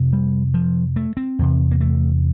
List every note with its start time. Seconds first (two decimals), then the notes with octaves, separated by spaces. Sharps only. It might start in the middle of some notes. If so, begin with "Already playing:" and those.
Already playing: F2 C3
0.13 G3
0.54 F3
0.96 A3
1.17 C4
1.39 E2 C3
1.71 A#3
1.81 A3